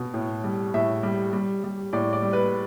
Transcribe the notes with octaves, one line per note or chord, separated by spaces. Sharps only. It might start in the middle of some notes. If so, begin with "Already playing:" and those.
Already playing: B2
A2
G3
A2 E5
G3
G3
G3
A2 D5
D5
G3
B4